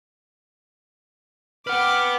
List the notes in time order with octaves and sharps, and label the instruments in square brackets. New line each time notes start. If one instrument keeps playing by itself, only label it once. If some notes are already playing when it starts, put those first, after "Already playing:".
[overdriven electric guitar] B4 F#5 [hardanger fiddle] G5 D6 [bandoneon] F6